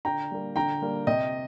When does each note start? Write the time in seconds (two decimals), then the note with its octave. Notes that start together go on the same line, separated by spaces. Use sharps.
0.05 D3 G5 A#5
0.31 G3 A#3
0.56 D3 G5 A#5
0.82 G3 A#3
1.07 C3 D#5 G5